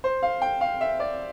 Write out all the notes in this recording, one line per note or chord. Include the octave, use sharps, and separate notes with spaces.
C5
F5
G5
F5
E5
D5